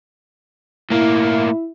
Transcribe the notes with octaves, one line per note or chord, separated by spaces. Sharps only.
A2 A#3 E4